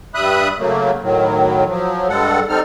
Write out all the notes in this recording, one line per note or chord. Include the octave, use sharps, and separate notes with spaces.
G2 G3 E5 B5 D#6 F#6
C#3 F#3 A3 A#3
A2 D#3 F#3
F3 F#3
G2 G3 G#3 A4 F#5
G3 C4 D#4 A4 F6